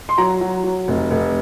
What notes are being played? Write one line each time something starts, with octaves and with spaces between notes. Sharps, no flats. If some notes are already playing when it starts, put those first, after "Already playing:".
C6
F#3 A#5
F#3
F#3
F1
F1